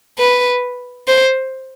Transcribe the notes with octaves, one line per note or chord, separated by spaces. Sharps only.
B4
C5